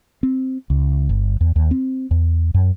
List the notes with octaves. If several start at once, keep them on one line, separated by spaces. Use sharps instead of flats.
C4
C#2
G1
E2
D#2
C4
E2
F#2